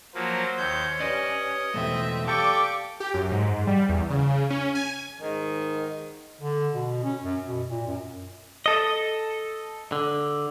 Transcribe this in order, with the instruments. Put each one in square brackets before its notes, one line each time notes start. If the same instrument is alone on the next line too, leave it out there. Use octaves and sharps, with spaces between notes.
[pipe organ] F3 F#3 A#3 [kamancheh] C5
[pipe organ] D#2 G6 [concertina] C#5
[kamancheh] C#4 [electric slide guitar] G4 B4 D5 [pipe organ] D#5
[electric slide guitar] E2 B2 A3 [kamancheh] C4 E5
[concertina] G4 A4 [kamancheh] D5 D6 [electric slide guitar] F5 A5 [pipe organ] G5 C#6
[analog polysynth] G4
F#2
G#2
G3
E2
C#3
C#3
C#4
G#5
[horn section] G#2 D#3
[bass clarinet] D3
B2
C#4
F#2
B2
A#2
F#2
[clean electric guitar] A4 D#5
D3